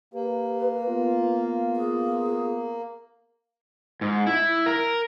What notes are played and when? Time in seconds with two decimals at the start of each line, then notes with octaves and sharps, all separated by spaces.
0.14 A#3 G4 B4
0.88 B3 F4
1.75 G#4
4.01 G#2
4.27 E4
4.66 A#4